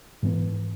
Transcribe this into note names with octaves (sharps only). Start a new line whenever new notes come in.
G#2 E3 B3